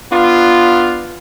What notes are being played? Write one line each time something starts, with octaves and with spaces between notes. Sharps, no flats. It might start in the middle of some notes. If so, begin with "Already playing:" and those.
B3 D4 F4